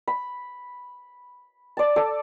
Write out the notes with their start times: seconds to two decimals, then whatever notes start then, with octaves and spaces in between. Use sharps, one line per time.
0.08 B5
1.77 D5 A5
1.96 A4 D5